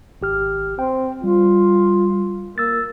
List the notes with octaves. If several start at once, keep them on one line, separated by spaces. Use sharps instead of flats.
G#1 G4 F6
C4 G5
G3 F4
A#3 E6 A6